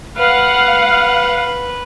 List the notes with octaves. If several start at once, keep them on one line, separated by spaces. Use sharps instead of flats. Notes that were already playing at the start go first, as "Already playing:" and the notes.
B4 F5 F#5